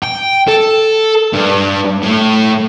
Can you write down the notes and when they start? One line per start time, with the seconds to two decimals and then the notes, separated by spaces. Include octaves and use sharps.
0.03 G5
0.48 A4
1.33 G2
2.03 A2